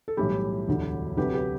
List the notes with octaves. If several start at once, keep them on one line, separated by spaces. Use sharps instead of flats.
A4
B1 A2 E3 G3 E4 G4
E1 D2 D3 F#3
D2 C3 F#3 G4 B4
G4 B4